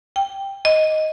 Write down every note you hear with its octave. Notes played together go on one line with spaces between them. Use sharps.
G5
D#5